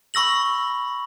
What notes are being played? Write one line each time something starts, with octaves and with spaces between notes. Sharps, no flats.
B5 C#6 E6 A#6 F#7